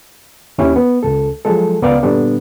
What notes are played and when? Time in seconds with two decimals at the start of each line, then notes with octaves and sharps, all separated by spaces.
0.58 D#2 C#4 E4 G4
0.76 B3
1.03 C#2 A4
1.45 F3 F#3 G#3 A4
1.82 C#2 B3 A#4 D5 F5 G5
2.03 A#2 D3 G3 B3 D4